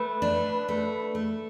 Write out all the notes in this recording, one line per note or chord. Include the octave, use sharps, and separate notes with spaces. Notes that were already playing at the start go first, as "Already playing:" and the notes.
Already playing: A3 B4
D4
A3
A3